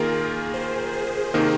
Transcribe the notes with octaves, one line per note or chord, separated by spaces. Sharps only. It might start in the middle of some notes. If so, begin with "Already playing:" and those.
Already playing: D#3 A#3 F4 G#4 A#4
G#4
C5
G#4
C3 D#3 A#3 D#4 A#4